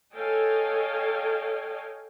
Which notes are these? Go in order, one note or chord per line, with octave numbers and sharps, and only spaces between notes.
A4 C#5 D#5 F5 G5 G#5